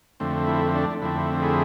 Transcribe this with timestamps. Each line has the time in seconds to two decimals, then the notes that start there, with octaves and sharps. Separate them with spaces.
0.20 F2 D3 A3 C4
0.47 E4
0.75 D4
1.02 F2 D3 A3 C4 E4
1.42 E4 G#4